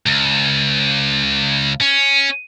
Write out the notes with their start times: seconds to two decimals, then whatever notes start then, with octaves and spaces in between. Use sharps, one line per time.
0.06 C#2
1.81 C#4